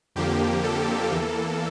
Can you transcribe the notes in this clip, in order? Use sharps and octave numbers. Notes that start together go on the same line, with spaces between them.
F2 D3 F3 A#3 G4
A4
E2 E3 A#3